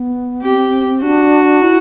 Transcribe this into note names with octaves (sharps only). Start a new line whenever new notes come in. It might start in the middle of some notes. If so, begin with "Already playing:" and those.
Already playing: B3
C4 G4
D4 F#4
E4